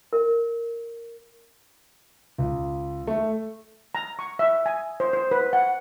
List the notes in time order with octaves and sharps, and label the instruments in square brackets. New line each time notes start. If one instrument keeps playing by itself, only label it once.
[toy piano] A#4
[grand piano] C#2
A3
[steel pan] A#5
C#6
E5
G#5
C5
C5
B4
F#5